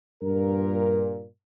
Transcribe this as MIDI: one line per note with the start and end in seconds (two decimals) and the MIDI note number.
0.23 1.26 43
0.23 1.26 46
0.23 1.26 70